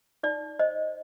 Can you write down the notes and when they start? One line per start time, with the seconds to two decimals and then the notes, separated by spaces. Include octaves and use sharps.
0.23 D#4 D5
0.59 C5 D#5